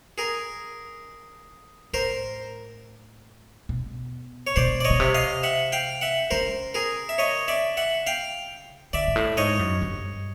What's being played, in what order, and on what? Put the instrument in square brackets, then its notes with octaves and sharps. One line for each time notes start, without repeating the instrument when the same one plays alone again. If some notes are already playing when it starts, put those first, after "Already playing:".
[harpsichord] G#4 A#4
[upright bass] A2 [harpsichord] A#4 C5
[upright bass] B2
[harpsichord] C#5
[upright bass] B2 [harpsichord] C5 D5
[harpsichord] D5
C#5 D#5
[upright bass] B2
C3
[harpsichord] D#5 F5
E5 F#5
F5 G5
E5 F#5
[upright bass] C#3 [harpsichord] A#4 C5
[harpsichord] G#4 A#4
E5
C#5 D#5
D5 E5
E5 F#5
F5 G5
[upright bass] D3 [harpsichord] D5 E5
[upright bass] G#2
A2
[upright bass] G#2 [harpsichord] C#5 D#5
[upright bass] F#2
G2